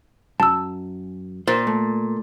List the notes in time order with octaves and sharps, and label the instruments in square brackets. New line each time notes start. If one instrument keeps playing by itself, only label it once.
[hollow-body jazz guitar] F#2 [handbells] A5 E6
[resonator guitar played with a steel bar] A#2 [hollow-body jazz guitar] C5
[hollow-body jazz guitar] A3